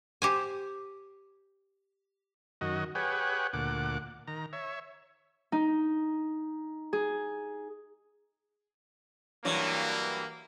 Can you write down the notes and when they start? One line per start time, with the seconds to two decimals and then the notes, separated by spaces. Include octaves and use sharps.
0.22 G4 C5 G#5
2.61 F#2 D#3 F#4 D#5
2.95 G4 G#4 B4 C#5 F#5
3.53 D2 A#2 F#5 D6
4.28 D#3 A#5
4.53 C#5 E5
5.52 D#4
6.93 G#4
9.45 G2 E3 F#3 A#3